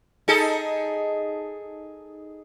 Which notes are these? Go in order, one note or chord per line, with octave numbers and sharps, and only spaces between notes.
D#4 G#4 A4